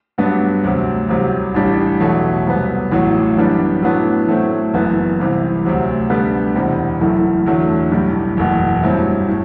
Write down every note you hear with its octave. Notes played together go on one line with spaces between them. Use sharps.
G2 F#3 B3 D4
D2 C3 F#3
C2 C3 F#3
A1 A2 G3 D4
E2 B2 F#3 A3
C2 C3 F#3 B3
A1 A2 F#3
F#2 E3 G3 B3 D4
A2 F#3 B3 D4
A2 F#3 A3 C4
F#1 F#2 E3 B3
C2 C3 E3
D2 C3 F#3
D2 D3 G3 B3
E1 E2 C3
F#1 F#2 E3 A3 E4
E2 D3 F#3 A3
B1 A2 G3
F#1 E2 B2
G2 F#3 C4 E4
A2